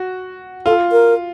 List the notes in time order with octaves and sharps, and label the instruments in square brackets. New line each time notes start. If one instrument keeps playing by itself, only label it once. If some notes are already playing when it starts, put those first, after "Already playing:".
Already playing: [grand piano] F#4
[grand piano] F4 [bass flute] A4
[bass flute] A#4